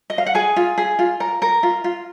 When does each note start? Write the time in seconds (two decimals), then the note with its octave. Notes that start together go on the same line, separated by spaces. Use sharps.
0.10 D#5
0.18 F5
0.26 F#5
0.35 G#4 G#5
0.56 F4
0.78 G#4
0.99 F4
1.20 A#4
1.42 A#4
1.63 F4
1.84 F4